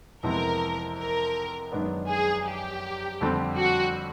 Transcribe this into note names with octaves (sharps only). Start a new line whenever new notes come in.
F2 C3 E3 G#3 B3 A#4
A#4
F#2 D#3 G#3 B3 D4
G#4
G4
F2 D3 G3 C4
F#4